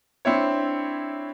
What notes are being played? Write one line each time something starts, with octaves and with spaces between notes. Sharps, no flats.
C4 D4 E4 C#5